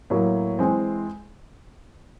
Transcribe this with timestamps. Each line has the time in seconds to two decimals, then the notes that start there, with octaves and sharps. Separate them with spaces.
0.10 A2 F#3 A#3
0.59 E3 G#3 C4